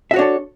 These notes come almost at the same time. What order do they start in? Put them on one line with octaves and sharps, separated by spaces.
E5 F#4 C#5 D4 A4